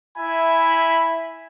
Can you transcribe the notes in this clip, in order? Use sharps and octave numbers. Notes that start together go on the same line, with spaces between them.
E4 E5 G#5 B5